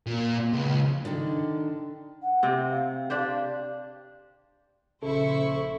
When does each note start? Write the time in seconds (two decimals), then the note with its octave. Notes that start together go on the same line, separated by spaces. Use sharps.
0.07 A#2
0.53 C#2
1.05 D3 D#3 D4
2.23 F#5
2.43 C3 C4
2.71 F5
3.10 D4 G4 C5
5.03 A#1 C#3 E4 A4 C5 C#6